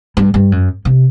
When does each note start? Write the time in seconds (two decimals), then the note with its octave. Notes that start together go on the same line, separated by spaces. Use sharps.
0.17 G2
0.34 G2
0.52 F#2
0.85 C3